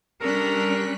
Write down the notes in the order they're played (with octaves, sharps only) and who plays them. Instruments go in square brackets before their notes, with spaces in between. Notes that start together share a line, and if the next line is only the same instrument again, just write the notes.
[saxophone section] C3 A4 A#4 [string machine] G3 F#6 B6 [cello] C#4 D4